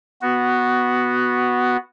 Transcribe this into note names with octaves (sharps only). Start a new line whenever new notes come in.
B3 F#4